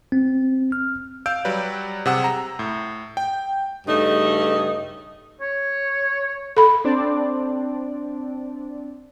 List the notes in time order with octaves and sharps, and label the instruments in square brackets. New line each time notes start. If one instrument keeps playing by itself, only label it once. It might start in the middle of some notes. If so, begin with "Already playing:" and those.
[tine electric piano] C4
F6
[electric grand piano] F5 E6 G6 D7
F#3 G3 B4 D5
C3 G#4 F#5 E6
A#5
A2
G5
[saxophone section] G2 C#3 A3 D#4
[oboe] C#5
[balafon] A4 B5
[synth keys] C4 D4 D5